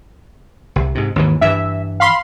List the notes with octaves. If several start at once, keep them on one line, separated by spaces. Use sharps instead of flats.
C2
G#2 C3
D#2 G#2 E3
G2 E3 E5
F5 B5 C6